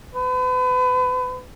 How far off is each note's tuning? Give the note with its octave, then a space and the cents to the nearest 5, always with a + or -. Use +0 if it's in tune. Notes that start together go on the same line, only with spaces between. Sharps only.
B4 +35